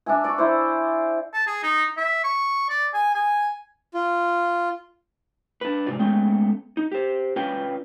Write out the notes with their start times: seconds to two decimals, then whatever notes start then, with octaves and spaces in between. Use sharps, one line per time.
0.06 D4 E5 G#5
0.24 D5 C#6
0.38 E4 C5
1.34 A5
1.47 G#4
1.63 D#4
1.97 E5
2.24 C#6
2.69 D5
2.94 G#5
3.14 G#5
3.94 F4
5.61 D4 B4
5.86 G#2 C3 F4 D5
5.99 G#3 A3 B3 C#4 G5
6.77 D#4
6.92 G4 C5
7.36 C#4 F4 B4 D5 G5